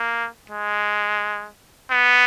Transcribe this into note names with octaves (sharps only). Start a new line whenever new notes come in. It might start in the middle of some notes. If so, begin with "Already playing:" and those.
Already playing: A#3
G#3
B3